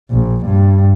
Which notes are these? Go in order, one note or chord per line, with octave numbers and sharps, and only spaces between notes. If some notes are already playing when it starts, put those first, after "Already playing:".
A#1
G2